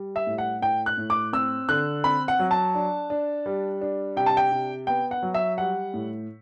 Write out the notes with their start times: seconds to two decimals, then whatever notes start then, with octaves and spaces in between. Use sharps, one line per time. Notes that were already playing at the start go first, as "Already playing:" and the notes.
Already playing: G3
0.16 E5
0.27 A2
0.38 F#5
0.62 A2 G5
0.86 F#6
0.98 A2
1.10 D6
1.33 C4 E6
1.69 D3 F#6
2.04 C4 B5
2.28 F#5
2.39 F#3
2.51 A5
2.75 D4
3.10 D4
3.46 G3
3.81 D4
4.16 C3 G5
4.26 A5
4.37 G5
4.52 C3
4.87 B3 G5
5.11 F#5
5.23 F#3
5.34 E5
5.58 G3 F#5
5.94 A2